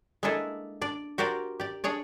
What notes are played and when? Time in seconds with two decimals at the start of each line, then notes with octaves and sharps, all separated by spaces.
0.23 G#3 A#3 D4 E4 G#4 A4
0.81 D4 D5
1.18 F#4 G4 A#4 C5 D5
1.60 G4 D5
1.84 D4 G#4 C#5 D5